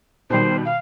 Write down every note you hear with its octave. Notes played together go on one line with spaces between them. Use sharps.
B2 D#3 G3 C5
F5